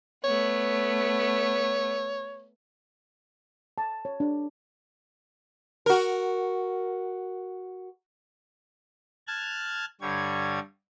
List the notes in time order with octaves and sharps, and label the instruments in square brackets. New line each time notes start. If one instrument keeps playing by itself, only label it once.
[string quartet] A3 B3 [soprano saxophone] C#5
[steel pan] A5
C#5
D4
[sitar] F#4 A#4
[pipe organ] A5 F6 F#6 G#6
G2 D3 G3 C#5 G#6